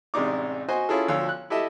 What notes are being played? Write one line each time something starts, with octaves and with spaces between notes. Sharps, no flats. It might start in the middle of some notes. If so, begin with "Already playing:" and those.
A1 C3 G#3 D4 D#4 D6
F#4 C5 D#5 G#5
C#4 E4 F4 G#4 A4
D2 F3 C#5 F5 E6
F#6
E4 G4 A4 D#5 E5